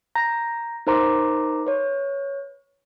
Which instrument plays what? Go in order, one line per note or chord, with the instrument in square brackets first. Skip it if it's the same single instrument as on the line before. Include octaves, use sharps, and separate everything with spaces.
[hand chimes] A#5 G6 A#6
D#4 A#4 C5 A#5 C6 D6
B4 C#5